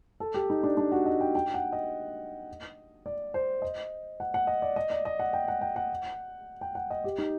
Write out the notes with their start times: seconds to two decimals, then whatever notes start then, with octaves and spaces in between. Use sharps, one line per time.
0.20 A4
0.34 G4
0.50 D#4
0.63 D4
0.77 D4
0.92 F#4
1.06 D#5
1.21 G5
1.35 G5
1.54 F#5
1.73 D#5
3.06 D5
3.34 C5
3.62 D#5
4.20 F#5
4.34 F#5
4.47 D#5
4.62 D5
4.76 D#5
4.90 D5
5.05 D#5
5.19 F#5
5.33 G5
5.48 F#5
5.61 G5
5.76 F#5
6.61 G5
6.75 F#5
6.90 D#5
7.04 G4
7.18 D#4